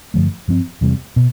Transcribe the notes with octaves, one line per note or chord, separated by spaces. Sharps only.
G2 D3 F3 A3
G2 F3 C4
E2 C3 G3
B2